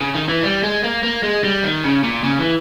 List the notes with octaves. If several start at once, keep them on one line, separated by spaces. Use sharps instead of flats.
C#3
D#3
E3
G3
G#3
A#3
A#3
G#3
G3
D#3
C#3
A#2
C#3
E3